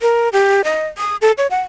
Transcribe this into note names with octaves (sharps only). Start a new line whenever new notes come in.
A#4
G4
D#5
D#6
A4
C#5
F#5